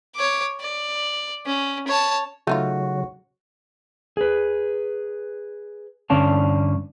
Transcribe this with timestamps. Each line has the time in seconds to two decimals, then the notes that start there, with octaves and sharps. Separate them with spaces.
0.16 C#5 D6
0.60 D5
1.46 C#4
1.88 C#5 A5
2.47 C#3 F#3 A3 D#4 F4 F#4
4.17 G#4 B4
6.10 G2 D3 C#4 D5 F5 A5